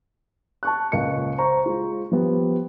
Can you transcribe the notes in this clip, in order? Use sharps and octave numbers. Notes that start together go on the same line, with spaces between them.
A5 C#6 F#6
C#2 A#2 D#5 C#7
C5 A#5 C#6
G#3 F4
F3 G3 B3